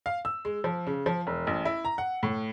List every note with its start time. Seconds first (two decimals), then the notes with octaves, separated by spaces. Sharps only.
0.06 F5
0.25 E6
0.45 G#3
0.64 F3
0.87 C#3
1.06 F3
1.27 E1
1.47 A1
1.65 E4
1.85 A#5
1.98 F#5
2.23 A2